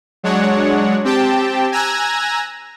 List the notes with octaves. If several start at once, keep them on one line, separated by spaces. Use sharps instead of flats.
F#3 G#3 D4 C#5 F#5
C4 G4 G5 A5
G#5 A#5 E6 F#6 G#6 A#6